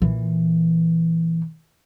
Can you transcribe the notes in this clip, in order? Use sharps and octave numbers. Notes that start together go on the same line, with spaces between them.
A#2 E3